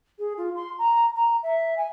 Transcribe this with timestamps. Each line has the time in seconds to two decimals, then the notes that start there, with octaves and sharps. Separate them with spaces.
0.19 G#4
0.38 F4
0.55 C6
0.78 A#5
1.16 A#5
1.43 E5
1.77 G#5